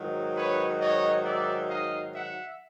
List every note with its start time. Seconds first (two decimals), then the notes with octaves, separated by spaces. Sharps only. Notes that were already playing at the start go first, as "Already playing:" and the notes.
Already playing: G#2 D#3 F#3
0.35 B4 C#5
0.80 C#5 D#5
1.25 D5 E5
1.70 D#5 F5
2.14 E5 F#5